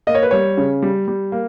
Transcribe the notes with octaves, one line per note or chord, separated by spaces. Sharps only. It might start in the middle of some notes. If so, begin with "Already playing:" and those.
A#3 D#5
C#5
B4
G3 C#5
C#3
G3
G3
A#3